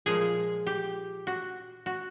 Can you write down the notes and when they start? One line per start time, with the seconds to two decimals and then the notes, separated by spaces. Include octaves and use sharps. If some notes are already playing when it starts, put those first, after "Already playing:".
0.06 A#2 F3 G#3 G#4
0.67 G4
1.27 F#4
1.86 F#4